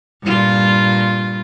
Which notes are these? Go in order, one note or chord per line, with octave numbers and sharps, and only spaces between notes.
G2 A#2 F4